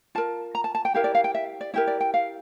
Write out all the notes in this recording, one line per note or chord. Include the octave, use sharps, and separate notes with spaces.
F4 A#4 A5
A#5
A5
A5
G5
E4 G4 A#4 F5
D5
F5
G5
E5
D5
E4 G4 A#4 E5
D5
G5
F5